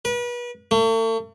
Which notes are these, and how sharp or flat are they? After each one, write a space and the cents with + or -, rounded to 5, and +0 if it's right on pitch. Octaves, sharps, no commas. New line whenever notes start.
B4 -35
A3 +40